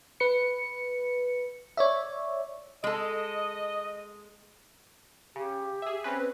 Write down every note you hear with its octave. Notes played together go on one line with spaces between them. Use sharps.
B4 C#7
C#5 D5 E5
G#3 A4 D#5
C#3 G4
G#4 E5
C4 C#4 B4